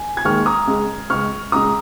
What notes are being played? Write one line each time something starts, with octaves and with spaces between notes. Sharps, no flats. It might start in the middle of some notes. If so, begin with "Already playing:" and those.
Already playing: G#5
G#6
D#2 D#3 G#3 C#6 F6
A#5 D#6
C#2 C#3 G#3
C#2 C#3 G#3 C#6 F6
C#2 C#3 G#3 A#5 D#6